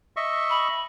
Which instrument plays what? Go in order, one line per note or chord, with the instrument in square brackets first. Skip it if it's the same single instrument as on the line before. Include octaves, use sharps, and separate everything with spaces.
[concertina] D#5 E5 C#6
[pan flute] B5